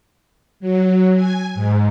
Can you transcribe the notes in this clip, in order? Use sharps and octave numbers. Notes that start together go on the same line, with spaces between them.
F#3
G#5
G#2